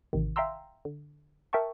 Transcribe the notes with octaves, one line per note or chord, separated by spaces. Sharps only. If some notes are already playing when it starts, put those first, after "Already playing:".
A1 C3 D#3
E5 F5 G5 A#5 C6 E6
D3
A#4 E5 G5 A5 C#6